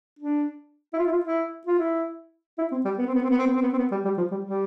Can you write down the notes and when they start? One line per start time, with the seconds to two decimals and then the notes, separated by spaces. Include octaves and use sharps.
0.19 D4
0.93 E4
0.99 F4
1.07 E4
1.12 F4
1.25 E4
1.67 F4
1.79 E4
2.58 E4
2.71 C4
2.85 G3
2.98 B3
3.06 C4
3.14 B3
3.22 C4
3.30 B3
3.38 C4
3.46 B3
3.54 C4
3.62 B3
3.73 C4
3.78 B3
3.91 G3
4.05 G3
4.18 F3
4.31 G3
4.45 G3